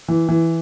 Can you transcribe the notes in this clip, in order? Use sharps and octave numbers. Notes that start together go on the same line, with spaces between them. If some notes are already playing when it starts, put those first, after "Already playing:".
E3
E3